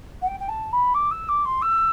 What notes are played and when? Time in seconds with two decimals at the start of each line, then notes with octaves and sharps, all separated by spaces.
0.21 F#5
0.27 G5
0.39 G5
0.48 A5
0.72 B5
0.94 D6
1.11 E6
1.28 D6
1.45 C6
1.61 E6